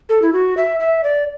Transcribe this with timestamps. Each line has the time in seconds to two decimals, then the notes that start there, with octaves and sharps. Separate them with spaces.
0.09 A4
0.22 E4
0.33 F#4
0.57 E5
0.80 E5
1.04 D5